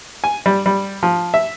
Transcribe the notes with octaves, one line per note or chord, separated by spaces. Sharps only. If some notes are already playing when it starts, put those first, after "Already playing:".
G#5
G3
G3
F3
E5